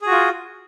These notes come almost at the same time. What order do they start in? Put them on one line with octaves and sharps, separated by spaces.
G#4 F#4 F4